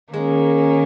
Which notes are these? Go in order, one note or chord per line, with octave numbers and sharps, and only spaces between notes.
D#3 G#3 A#3 C#4